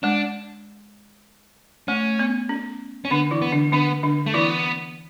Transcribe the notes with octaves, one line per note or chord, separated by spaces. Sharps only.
G#3 D4
A3 C#4
B3
C#4
C#4
D3 B3 D4
E3 E4
B3
D3 D4
D3 B3 D4
D3 D4
A3
E3 B3 E4